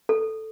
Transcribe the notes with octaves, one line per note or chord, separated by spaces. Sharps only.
A4